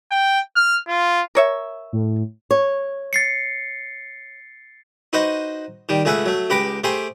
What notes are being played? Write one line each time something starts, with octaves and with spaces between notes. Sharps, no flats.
G5
F6
F4
A#4 C#5 E5
A2
C#5
A6 C7 C#7
D#4 F#4 B4 C5 D#5
D#3 G3
C#2 A3 G#4 B4 E5 F#5
F#3 A3
C#2 G4 B4 A#5 B5 D6
A3 G4 G#4 C5 B5 C6